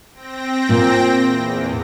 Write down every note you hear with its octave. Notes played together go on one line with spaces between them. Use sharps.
C4 G5 A#6
A#2
E2